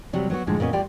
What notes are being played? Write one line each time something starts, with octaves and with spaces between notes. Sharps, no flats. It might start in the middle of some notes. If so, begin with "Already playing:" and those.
C3 F#3 G3
F#3 B3 F#4
A2 D3 F3 G#3
D2 A#2 B3 C#4 D#5
A2 G3 F4 G4 D5 G5